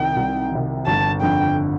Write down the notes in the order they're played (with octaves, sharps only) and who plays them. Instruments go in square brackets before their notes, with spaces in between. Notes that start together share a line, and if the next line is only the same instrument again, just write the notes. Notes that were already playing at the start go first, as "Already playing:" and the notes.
Already playing: [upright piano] C2 C3 D#3 [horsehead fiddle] G5
[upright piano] C2
C3 D#3
[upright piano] G1 [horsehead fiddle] A5
[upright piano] F2 D3 [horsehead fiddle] G5